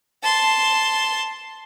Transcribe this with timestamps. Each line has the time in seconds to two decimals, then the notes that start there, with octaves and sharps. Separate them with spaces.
0.22 A5 C6